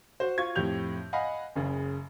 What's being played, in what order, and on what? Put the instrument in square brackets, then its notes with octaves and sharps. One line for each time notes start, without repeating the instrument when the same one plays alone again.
[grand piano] F#4 C5
F4 C#6 G#6
F2 A2 G4 G6 F7
D#5 F5 F#5 G#5 B5
F#1 C#3